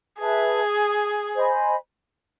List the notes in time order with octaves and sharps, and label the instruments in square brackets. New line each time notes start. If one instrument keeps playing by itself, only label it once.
[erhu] G#4 [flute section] B4 E5 A5
[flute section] C5 D#5 G#5 B5